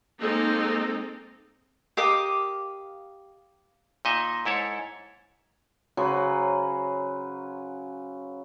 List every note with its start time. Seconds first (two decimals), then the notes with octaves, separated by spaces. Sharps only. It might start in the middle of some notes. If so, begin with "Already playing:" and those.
0.20 G#3 A#3 C4 D#4 A4
1.97 G4 A#4 D#5 F5 D6 D#6
4.05 A#2 D#4 D#5 E5
4.45 G#2 E4 A4 C#5
5.97 C#3 F#3 B4 C5